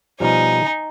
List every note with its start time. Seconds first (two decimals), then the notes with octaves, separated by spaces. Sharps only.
0.20 B2 F3 G3 D#4 G#5